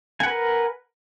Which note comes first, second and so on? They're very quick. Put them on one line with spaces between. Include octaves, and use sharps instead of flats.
G#5 F#5 B4 A#4